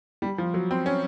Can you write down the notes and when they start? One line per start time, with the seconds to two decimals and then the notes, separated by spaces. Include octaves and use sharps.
0.22 G3
0.38 F3
0.54 F#3
0.71 C4
0.86 C#4